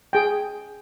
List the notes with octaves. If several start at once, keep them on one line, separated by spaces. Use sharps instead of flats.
G#4 G5